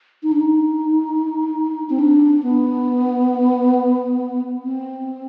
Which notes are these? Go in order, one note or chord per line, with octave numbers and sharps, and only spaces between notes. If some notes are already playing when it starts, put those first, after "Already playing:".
D#4
D4
D#4
C4
D4
B3
C4